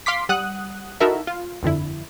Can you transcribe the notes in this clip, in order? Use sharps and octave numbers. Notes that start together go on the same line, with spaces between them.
F5 C6 D6 B6
G3 F#5 D#6 F#6
D#4 E4 F#4 A4 A#4 E5
F4
G1 F2 D3 E4